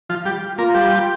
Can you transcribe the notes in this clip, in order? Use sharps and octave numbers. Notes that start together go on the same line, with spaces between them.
F3 F4
G3 G4
A#3 F4 A#4
G3 G4